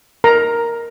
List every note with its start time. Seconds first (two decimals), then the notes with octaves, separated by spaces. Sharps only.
0.24 A#4 A#5